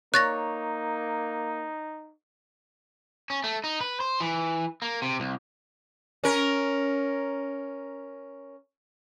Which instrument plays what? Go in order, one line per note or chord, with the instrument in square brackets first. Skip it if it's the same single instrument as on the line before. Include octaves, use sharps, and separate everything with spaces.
[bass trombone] A#3 [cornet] D#4 [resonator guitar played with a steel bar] C#5 [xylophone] F#6 A6 A#6
[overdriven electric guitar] C#4
A3
D#4
B4
C5
E3
A#3
C3
C2
[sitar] C#4 A#4